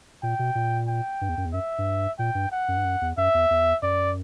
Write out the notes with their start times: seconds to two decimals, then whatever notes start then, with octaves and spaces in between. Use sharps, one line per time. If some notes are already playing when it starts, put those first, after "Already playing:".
0.23 A#2 G5
0.39 B2
0.55 A#2
0.88 G5
1.21 G2
1.29 E2
1.37 F#2
1.45 E2
1.53 F#2 E5
1.78 G2
2.19 A#2 G5
2.35 G2
2.52 F#5
2.68 F#2
2.77 G2
2.85 F#2
3.01 E2
3.17 F#2 E5
3.34 E2
3.50 E2
3.82 F#2 D5